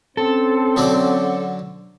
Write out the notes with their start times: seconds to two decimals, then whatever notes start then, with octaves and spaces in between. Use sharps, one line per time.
0.17 C4 C#4 A4 C5
0.76 D3 F#3 D5